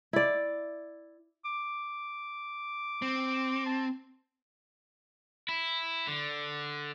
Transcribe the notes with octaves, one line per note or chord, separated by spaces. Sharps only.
E4 D5
D6
C4
A5
E4
D3